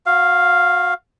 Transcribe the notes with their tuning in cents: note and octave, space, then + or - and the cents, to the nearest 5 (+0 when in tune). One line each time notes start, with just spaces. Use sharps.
F#4 -30 F5 +0